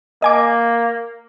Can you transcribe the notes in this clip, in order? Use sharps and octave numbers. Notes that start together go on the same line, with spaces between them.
A#3 D#5 G#5 D6